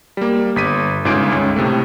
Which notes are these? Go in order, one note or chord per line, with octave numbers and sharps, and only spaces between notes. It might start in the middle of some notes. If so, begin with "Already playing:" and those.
G3 A#3
G1 B6 D#7
G1 G#2 C#3 F4 G#4 D7
C#2 C#4
A2 C3 A3